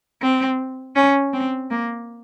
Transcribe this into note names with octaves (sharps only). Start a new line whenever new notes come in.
C4
C#4
C4
A#3